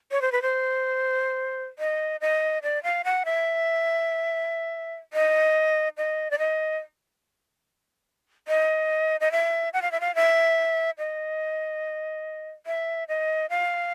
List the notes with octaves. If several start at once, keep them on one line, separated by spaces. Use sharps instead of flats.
C#5
C5
B4
C5
D#5
D#5
D5
F5
F#5
E5
D#5
D#5
D5
D#5
D#5
D#5
E5
F#5
F5
E5
F5
E5
D#5
E5
D#5
F5